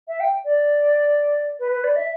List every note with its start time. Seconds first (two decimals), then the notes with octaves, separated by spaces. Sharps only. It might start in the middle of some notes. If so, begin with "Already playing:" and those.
0.08 E5
0.20 G5
0.44 D5
1.59 B4
1.71 B4
1.84 D5
1.96 E5